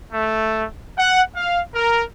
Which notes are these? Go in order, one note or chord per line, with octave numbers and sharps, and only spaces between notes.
A3
F#5
F5
A#4